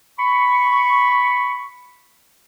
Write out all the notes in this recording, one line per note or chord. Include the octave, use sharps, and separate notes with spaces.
B5 C#6